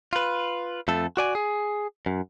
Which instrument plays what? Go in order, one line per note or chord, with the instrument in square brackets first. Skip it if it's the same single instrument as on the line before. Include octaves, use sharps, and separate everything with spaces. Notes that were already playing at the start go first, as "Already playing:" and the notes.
[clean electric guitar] F4 B4
F2 A3 A4
F#4 D5 G#5
G#4
F#2